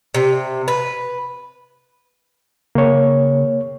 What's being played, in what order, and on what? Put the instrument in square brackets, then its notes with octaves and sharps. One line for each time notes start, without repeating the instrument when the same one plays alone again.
[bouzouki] C3
B4
[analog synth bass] C#3 [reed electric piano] A#3 C#5